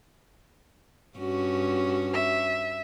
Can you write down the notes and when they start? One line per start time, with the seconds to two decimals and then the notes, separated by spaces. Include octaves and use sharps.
1.18 G2 C#4 F#4
2.13 E5